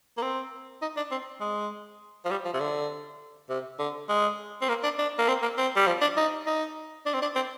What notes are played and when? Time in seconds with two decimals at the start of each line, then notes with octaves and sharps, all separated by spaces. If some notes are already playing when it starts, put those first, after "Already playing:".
0.18 A#3
0.22 C4
0.82 D#4
0.97 D4
1.11 C4
1.41 G#3
2.25 F3
2.31 G3
2.45 F3
2.54 C3
2.60 D3
3.49 C3
3.79 D3
4.09 G#3
4.62 C4
4.69 A#3
4.84 D4
4.98 D4
5.18 A#3
5.28 C4
5.42 A#3
5.58 C4
5.76 G3
5.87 F3
6.01 D4
6.17 D#4
6.46 D#4
7.06 D4
7.14 C4
7.22 D4
7.35 C4